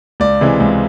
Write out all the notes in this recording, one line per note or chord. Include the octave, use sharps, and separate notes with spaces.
C#2 D5
C3 E3 G#3
C#2